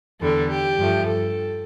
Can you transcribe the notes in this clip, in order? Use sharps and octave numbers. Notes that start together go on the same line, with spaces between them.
E2 D3 G3 A4
G4
G2 F3 A3
A4